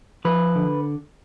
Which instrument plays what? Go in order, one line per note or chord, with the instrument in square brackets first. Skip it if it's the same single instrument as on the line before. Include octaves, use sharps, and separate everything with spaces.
[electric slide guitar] F3 B4
D3